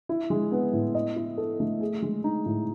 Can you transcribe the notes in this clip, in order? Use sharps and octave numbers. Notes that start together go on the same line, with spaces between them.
E4
G#3
B3
A2
D#5
E4
A4
A3
G#4
G#3
D#4
A2